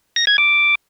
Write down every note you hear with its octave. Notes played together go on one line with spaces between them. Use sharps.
A#6
G#6
D6